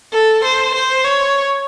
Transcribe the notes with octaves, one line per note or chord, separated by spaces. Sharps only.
A4
C5
C5
C#5